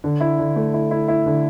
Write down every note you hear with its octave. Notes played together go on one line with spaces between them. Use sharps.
D3
E4
D3
A3
E4
E4
E4
D3